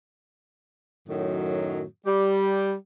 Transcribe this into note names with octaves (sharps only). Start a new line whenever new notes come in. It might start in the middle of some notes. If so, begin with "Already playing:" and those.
F#2 A2 D#3 F#3
G3 G4